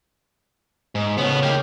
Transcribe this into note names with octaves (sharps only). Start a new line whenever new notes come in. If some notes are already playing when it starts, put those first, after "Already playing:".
G#2
A2 C#3 B3
A#3 G4 G6